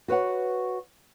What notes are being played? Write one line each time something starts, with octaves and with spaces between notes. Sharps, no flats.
F#4 B4 C#5 F#5